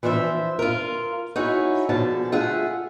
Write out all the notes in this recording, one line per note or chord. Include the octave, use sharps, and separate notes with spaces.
E3 F3 D4 C5 E5
F4 A#4
D#4 E4 F#4 G#4 C#5
B2 D3 F3 G#4 A5
A3 F4 G#4 E5 F#5